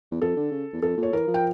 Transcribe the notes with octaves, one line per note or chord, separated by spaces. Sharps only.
E2
F2 A4
D3
C#3
E2
F2 A4
A#2
C#5
E3 A#4
F3
G5